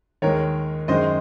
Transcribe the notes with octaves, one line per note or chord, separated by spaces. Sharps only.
D#2 D#3 G#3 A#4 C#5
F#2 D#3 G#3 C5 D#5